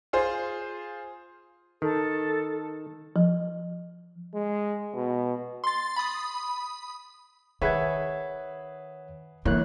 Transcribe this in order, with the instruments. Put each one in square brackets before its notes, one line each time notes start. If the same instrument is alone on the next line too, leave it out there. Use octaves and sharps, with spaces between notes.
[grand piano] F4 G#4 C5
[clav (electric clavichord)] D#3 [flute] A4
[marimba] F3
[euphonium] G#3
B2
[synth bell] C6 A6
B5 D#6
[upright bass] D#3 [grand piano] G#4 B4 E5 [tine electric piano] C#5 F#5 G#6
[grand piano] G1 [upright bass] E3 [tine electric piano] A#3 C#5 F#6